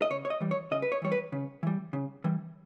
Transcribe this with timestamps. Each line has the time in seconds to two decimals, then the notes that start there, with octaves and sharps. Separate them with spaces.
0.02 D#5
0.10 C#3 C#5
0.25 C#5
0.30 D#5
0.41 E3 G3
0.51 C#5
0.71 C#3 D#5
0.82 B4
0.92 C#5
1.02 E3 G3 C#5
1.12 B4
1.32 C#3
1.63 E3 G3
1.93 C#3
2.24 E3 G3